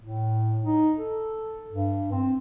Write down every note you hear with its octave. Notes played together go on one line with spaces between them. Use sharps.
A2
D#4
A4
G2
C4